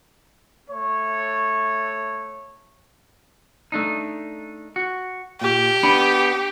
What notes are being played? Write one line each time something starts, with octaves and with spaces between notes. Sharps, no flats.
A3 C#5
A3 D4 D#4
F#4
A#2 G4
B3 D4 B5